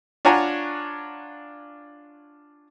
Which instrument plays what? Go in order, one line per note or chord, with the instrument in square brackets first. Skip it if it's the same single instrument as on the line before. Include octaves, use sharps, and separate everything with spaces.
[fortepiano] D4 F4 C#5 F#5 G#5 A#5